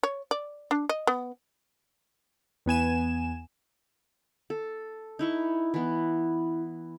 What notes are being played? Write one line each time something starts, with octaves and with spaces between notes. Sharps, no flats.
C#5
D5
D4
D#5
B3
E2 B3 G#5 E7
A4
D#4 E4 C#6
E3 B3